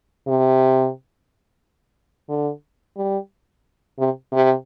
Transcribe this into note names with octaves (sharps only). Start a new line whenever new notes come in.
C3
D3
G3
C3
C3